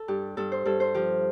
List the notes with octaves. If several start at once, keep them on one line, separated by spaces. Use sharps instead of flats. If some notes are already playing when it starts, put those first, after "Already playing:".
Already playing: A4
G2 G4
G2 A4
C5
G2 A4
C5
F3 G4